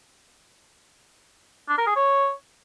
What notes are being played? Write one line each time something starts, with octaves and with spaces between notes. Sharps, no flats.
D4
A#4
G#4
C#5